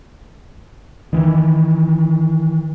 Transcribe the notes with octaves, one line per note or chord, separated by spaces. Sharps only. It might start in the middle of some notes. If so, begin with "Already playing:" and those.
D#3 E3